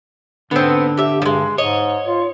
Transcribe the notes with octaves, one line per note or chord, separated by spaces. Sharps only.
G#2 D3 B3 C4
G4 E5
G2 F3 G#3
G#2 C#5 D#5
F4